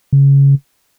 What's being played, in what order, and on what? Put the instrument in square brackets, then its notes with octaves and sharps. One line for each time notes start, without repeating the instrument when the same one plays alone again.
[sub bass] C#3